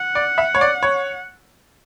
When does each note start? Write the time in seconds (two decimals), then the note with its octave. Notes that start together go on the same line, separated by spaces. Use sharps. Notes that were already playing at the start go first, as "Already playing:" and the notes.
Already playing: F#5
0.15 D5
0.38 E5
0.55 C#5
0.61 D5
0.83 C#5